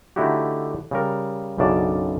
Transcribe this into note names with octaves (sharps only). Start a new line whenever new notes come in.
D3 A3 D#4 E4 F#4 G4
C#3 G3 A#4
B1 F#2 C#3 D4 D5 A5